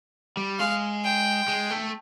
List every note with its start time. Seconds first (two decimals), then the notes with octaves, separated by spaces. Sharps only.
0.37 G3
0.59 G#3 F5
1.04 G5
1.48 G#3
1.71 A3